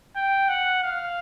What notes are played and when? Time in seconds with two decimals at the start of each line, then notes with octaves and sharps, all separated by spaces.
0.16 G5
0.49 F#5
0.83 F5